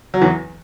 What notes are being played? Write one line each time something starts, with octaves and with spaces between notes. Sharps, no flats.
F#3
E2 E3